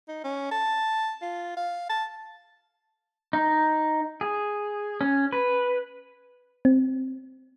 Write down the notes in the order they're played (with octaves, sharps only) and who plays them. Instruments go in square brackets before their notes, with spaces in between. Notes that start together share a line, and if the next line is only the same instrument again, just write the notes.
[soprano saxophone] D#4
C#4
A5
F4
F5
A5
[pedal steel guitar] D#4
G#4
C#4
B4
[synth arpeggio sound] C4